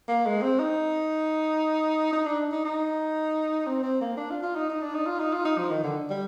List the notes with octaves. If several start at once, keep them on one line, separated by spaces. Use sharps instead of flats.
A#3
G#3
C4
D#4
D#4
D4
D#4
D#4
C4
C4
A#3
D4
F4
F4
D#4
D#4
D4
D#4
F4
D#4
F4
D#4
F3
D#3
D3
G3